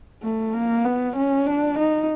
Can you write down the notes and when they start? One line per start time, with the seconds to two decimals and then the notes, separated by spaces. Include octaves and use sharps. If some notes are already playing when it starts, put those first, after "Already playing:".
0.23 A3
0.53 A#3
0.84 B3
1.17 C#4
1.47 D4
1.79 D#4